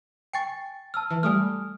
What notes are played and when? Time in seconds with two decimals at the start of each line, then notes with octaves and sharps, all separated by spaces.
0.33 G5 G#5 C#6 A6 C7 C#7
0.94 A5 E6 F6
1.10 E3
1.23 G3 A3 G#5 D#6 F6